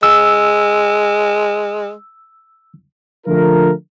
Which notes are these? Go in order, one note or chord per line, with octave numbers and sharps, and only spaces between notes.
G#3 E6
D3 F3 A3 F4 A#4